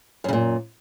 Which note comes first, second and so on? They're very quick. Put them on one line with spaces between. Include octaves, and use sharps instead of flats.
F#2 C#3 A#2